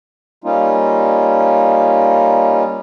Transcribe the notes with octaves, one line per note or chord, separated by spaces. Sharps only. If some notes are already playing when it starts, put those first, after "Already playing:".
G3 A#3 C#4 D#4 F4